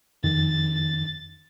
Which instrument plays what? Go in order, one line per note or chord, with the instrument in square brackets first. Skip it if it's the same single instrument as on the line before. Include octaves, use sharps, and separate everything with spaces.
[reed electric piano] F2 D#3 [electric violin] A6